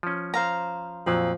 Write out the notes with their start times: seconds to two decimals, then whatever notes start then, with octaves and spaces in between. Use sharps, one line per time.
0.03 F3 C#4
0.34 C5 F5 A#5
1.06 F2 A#2 F3 F#3